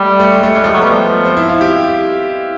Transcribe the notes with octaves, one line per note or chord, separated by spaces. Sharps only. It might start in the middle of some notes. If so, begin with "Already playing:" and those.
Already playing: G3 A3
A3
G#3
A3
G3 G#3
F3 A3
F#3
G3 B3
F3
C4
E4
F4
G4